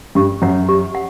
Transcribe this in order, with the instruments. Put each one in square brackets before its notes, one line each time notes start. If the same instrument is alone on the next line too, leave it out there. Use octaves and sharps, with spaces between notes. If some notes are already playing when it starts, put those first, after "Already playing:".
[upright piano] G2 [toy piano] G4
[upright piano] F#2 [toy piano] C#5 F#5
[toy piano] G4
F#5